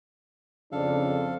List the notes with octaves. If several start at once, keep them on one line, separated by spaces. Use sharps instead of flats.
F2 C#3 D4 A4 F5